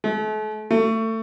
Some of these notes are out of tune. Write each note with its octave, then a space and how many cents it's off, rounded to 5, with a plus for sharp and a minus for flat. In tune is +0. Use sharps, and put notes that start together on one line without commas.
A3 -40
A3 +25